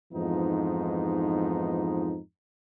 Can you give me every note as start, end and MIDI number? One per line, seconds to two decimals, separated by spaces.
0.12 2.18 41
0.12 2.18 44
0.12 2.18 52
0.12 2.18 53
0.12 2.18 59
0.12 2.18 63